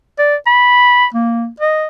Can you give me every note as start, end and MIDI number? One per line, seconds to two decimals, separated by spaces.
0.19 0.36 74
0.46 1.05 83
1.14 1.48 58
1.60 1.88 75